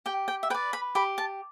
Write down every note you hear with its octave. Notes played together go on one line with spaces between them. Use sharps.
G4 G5
G5
E5
B4 D5 G5
B5
G4 B5
A5